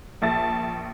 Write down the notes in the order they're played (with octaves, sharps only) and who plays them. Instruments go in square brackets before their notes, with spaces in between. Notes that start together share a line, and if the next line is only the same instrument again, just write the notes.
[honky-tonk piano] A#1 E5 A6 [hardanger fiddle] A5